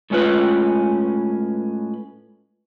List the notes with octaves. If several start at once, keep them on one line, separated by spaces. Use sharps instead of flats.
A2 G#3 C#4 F4 B4